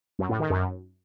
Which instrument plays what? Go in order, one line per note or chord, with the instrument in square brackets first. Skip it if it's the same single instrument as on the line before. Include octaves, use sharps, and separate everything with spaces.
[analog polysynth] F#2
A2
D#3
F#2